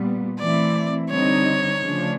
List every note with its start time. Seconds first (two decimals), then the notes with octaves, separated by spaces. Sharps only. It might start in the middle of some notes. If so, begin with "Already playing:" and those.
Already playing: A#2 G3 B3
0.39 E3 A3 C4 E4 D5
1.10 D3 G3 C4 D#4 C#5
1.80 C#3 F3 A3 D4